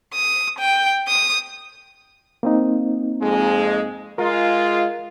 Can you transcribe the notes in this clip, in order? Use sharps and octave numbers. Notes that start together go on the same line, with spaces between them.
D#6
G5
D#6
A#3 C4 D#4
F2 G#3
G#3 F4 A#4